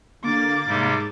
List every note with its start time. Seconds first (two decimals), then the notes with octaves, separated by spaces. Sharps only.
0.24 D3 A#3 D6 A6
0.67 G#2 C3 G3